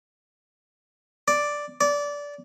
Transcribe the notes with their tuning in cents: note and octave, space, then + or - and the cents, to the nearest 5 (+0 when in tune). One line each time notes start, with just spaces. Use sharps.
D5 +0
D5 -20